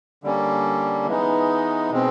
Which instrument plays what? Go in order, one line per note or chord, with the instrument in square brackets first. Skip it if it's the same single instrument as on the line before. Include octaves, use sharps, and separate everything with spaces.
[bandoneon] D3 G3 A#3 C#4
E3 G#3 B3 D#4
B2 G#3 C4